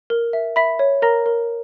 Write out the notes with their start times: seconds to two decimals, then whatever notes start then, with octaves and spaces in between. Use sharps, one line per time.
0.10 A#4
0.33 E5
0.56 E5 B5 B6
0.79 C#5
1.02 A#4 A#5 A#6
1.26 A#4